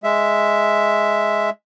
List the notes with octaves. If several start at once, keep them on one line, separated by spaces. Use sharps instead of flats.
G#3 E5